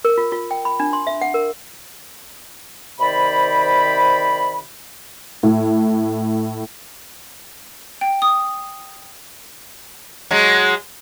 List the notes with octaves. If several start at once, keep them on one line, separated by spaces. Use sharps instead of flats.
A#4
F4
F4
G5
B5
D4
C6
E5
F#5
A#4
C3 D#3 C5 D5 B5
A2
G5
D#6
F#3 G#3